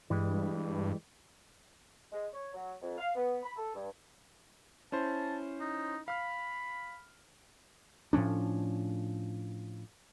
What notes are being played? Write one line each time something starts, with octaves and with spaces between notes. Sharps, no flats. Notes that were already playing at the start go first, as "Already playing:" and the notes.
G2 E3 G3 G#3
G#3
C#5
F#3
F2
F5
B3
B5
A4
G2
C#4 E4 C5 A5
D#4
F5 B5 F6
A2 F3 C#4 D4